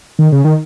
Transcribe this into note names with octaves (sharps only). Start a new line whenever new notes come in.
D#3
C#3
D#3